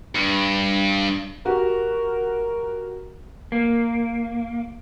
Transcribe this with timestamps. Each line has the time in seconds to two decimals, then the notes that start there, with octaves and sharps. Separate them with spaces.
0.15 G2
1.46 F#4 G4 A#4
3.52 A#3